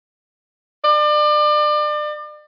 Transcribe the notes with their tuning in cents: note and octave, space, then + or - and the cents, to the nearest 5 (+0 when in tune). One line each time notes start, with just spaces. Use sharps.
D5 +35